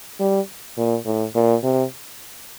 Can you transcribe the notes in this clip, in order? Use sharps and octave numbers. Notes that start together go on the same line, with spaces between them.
G3
A#2
A2
A#2
C3